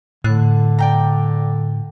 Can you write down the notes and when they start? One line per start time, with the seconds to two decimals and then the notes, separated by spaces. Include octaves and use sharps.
0.24 A2 D3 F#6
0.79 D5 G5 A#5